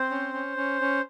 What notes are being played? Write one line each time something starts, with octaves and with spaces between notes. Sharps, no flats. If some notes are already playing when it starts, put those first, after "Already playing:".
Already playing: C4 C5
C#4
C#4
C#4
C#4